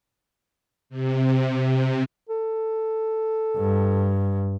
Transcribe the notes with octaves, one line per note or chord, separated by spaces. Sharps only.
C3
A4
G2